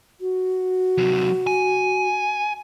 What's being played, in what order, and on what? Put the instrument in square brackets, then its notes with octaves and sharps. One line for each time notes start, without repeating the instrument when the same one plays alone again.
[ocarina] F#4
[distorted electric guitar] C3 F#3
G#5